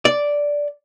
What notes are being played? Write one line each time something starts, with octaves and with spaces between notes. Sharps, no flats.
D5